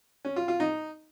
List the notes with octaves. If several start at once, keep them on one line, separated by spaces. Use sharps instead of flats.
C#4
F4
F4
D#4